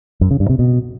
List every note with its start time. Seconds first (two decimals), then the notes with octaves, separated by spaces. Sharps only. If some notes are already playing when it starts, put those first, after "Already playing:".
0.21 F#2
0.31 C#3
0.40 G2
0.50 C3
0.59 B2